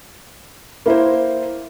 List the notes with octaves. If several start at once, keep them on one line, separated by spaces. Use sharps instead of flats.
A#3 E4 A#4 C5